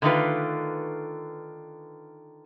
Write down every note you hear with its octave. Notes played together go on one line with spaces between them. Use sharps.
D3 D#3 A3 C4 F4 B4